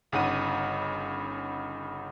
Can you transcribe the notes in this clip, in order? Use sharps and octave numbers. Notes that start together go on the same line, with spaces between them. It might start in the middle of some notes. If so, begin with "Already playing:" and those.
G1 C#3 D#4 F#5 D#7